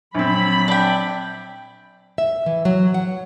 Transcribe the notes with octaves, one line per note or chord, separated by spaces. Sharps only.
A#1 F#3 C4 B5
D4 G5
E5
E3
F#3
F#5